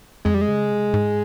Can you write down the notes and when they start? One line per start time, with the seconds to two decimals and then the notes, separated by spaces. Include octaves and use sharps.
0.25 F2 G#3
0.34 G3
0.41 G#3
0.48 C#3
0.71 C3
0.94 G#2